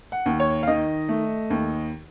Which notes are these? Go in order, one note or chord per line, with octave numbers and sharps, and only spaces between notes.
F#5
D#2
C#5
F5
D#3 D#5
A3
D#2